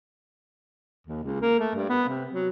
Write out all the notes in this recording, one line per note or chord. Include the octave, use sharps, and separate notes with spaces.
D#2
C#2
A#3
A3
G2
B3
C3
F#3